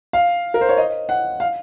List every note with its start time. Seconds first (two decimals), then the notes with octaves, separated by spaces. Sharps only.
0.13 F5
0.54 A#4
0.61 C5
0.69 C#5
0.77 D#5
1.09 F#5
1.40 F5